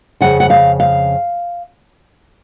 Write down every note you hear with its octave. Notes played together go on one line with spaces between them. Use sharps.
F2 C#3 F#5
F#5
F5
F5